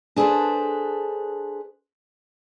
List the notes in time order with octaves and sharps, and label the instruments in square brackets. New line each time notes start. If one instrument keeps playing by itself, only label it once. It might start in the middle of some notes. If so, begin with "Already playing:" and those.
[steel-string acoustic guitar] D4 G#4 A4 B4 C5